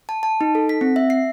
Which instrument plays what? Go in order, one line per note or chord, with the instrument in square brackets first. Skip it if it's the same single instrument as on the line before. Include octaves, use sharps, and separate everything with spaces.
[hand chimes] A5
A5
D#4
A4
B6
C4
E5
C7